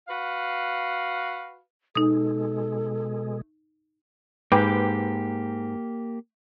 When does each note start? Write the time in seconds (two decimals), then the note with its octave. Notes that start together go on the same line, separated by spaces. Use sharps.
0.08 F#4 B4 F5
1.95 B2 G#3 D#4 A4 D#6
4.52 G#2 A#3 G4 B4 G5 D6